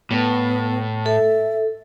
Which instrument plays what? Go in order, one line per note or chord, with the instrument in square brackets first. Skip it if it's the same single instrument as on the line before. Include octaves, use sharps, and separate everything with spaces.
[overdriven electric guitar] A2 [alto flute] B3
[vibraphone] A4 [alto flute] E5